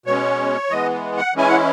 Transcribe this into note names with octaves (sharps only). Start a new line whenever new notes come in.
B2 G#3 C#4 C#5
E3 G#3 B3 D#5
F#5
E3 G#3 C#4 E4 G#5
F#5